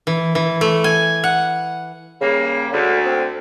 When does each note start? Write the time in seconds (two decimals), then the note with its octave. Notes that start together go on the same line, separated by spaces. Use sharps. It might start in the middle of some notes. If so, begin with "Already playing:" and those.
0.07 E3
0.35 E3
0.61 A3
0.84 G#5
1.24 F#5
2.21 C#3 G3 A#3
2.72 D2 D3
3.06 C4